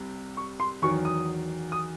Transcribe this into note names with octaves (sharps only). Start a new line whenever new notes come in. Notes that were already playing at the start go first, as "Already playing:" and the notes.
Already playing: C2 C3 C4
C#6
C6
E2 D#3 F#3 C#6
D#6
D#6